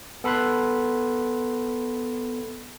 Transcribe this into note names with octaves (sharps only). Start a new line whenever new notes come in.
B3 A4 B5 C6 F#6